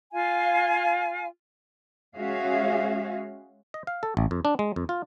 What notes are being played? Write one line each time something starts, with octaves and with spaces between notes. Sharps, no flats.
F4 F5 G#5
G#3 C#4 F#4 G#4 E5 F5
D#5
F5
A4
A1
F2
D4
G#3
F2
F4